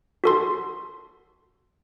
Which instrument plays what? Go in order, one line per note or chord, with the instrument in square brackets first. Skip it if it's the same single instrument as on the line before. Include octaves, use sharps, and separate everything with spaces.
[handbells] F#4 A4 C6